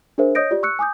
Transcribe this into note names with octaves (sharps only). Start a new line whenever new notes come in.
D4 G#4 A#4 C5 E5
C#5 D#5 D#6 G6 A#6 D7
F4 G4 D5
C#6 E6 F#6 C#7
G#5 D6 D#6 G6